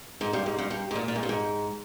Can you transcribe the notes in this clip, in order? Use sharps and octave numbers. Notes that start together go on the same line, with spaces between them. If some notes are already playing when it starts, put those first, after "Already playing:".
G#2
G2
G#2
G2
G2
G#2
A#2
A#2
G#2
G2
G#2